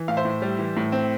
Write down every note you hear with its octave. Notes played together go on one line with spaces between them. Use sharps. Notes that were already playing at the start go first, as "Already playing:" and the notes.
Already playing: E3
A2 F5
C5 E5
A2
G3
E3
A2
C4